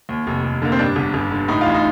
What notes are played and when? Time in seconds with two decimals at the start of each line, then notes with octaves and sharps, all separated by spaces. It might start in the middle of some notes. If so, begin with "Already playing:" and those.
0.09 D#2
0.27 F1
0.44 F1
0.62 D3 A#3
0.72 C4
0.79 G2 D4
0.96 G1
1.14 G1
1.31 D3
1.48 A2 D#4
1.61 F4
1.66 A1
1.74 D#4